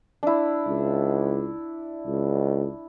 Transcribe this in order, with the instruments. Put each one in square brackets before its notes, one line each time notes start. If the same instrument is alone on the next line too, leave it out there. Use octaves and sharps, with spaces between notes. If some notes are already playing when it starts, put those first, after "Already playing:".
[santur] D4 E4
[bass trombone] C#2
C#2